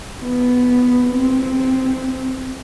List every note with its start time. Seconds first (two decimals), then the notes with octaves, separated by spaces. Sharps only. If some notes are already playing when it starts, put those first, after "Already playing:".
0.23 B3
1.09 C4